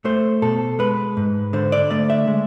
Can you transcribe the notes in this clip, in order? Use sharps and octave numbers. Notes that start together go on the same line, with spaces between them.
A3 C5
B2 A4
G#3 B4
G#2
D3 C5
D5
A3 D5
E5
G#3